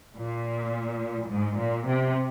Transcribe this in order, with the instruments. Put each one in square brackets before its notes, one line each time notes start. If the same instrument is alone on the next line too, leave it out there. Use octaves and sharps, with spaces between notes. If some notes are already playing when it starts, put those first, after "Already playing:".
[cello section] A#2
G#2
A#2
C3